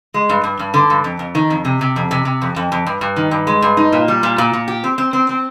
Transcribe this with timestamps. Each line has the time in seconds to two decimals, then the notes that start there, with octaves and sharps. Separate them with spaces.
0.14 G#3
0.29 G2
0.44 G2
0.59 G2
0.74 D3
0.90 G2
1.04 F2
1.19 F2
1.35 D#3
1.50 F2
1.65 C3
1.81 C3
1.96 F2
2.11 C3
2.25 C3
2.42 F2
2.56 F2
2.72 F2
2.87 G2
3.01 G2
3.16 D#3
3.31 G2
3.47 G#3
3.62 G2
3.77 D#4
3.92 A#2
4.08 G3
4.23 A#2
4.38 A#2
4.53 A#2
4.68 G4
4.84 C4
4.98 C4
5.13 C4
5.29 C4